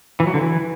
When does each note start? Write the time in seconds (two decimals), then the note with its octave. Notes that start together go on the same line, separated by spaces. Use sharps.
0.20 E3
0.27 F#3
0.34 D3
0.41 E3